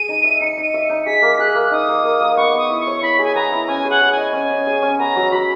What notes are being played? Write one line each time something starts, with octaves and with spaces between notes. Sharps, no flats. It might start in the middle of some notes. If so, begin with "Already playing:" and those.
Already playing: G#4 D#7
D#4
E5
D#4 C#7
D#4 D#7
E5
D#4 C#7
G#4 B6
A#3
G#4 F#6
A#3
D#4 D#6
A#3
A#3
A#3
B3 C#6
B3 D#6
E4
C#6
C#5
E4 B5
G#4
G#5
B3 A#5
E4
C#4 G#5
G#4
F#5
G#4
D#5 G#5
C#4 G#5
C#4
G#4
C#4
B3 A#5
F#3
F#3 B5